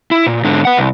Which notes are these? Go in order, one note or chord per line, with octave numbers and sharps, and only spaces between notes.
E4
A#2
G#2 D3
B4 F#5
C2